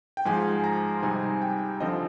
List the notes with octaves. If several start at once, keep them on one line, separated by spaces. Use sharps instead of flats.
G5
G#2 F3 G#3 G#5
A#5
C3 G3 C4 D#4 G#5
G5
D3 F3 C4 D#5